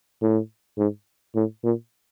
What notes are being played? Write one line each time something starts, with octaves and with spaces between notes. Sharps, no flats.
A2
G#2
A2
A#2